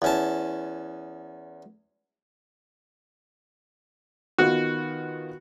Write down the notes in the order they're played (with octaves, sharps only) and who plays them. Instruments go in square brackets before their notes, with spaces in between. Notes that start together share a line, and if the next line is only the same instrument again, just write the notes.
[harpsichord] E2 C#4 A5
[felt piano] D#3 B3 F4 [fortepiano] F#4